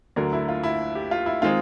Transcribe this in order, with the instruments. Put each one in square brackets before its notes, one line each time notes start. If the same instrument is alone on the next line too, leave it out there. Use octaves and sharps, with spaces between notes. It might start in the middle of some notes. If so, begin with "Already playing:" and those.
[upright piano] D2 D3 F#3 A#4
E4
F4
E4
G4
F4
E4
D#3 G#3 C4 D#4 F4